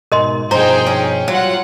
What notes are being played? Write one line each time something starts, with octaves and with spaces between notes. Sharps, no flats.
G#2 B2 A#4 D#5 C6
G2 B2 F3 D#4 G#4 C5 G5 A#5
C#4
F#3 G3 F4 F#5